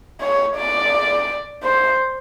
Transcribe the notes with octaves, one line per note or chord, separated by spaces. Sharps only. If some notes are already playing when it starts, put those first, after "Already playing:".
C#5
D5
C5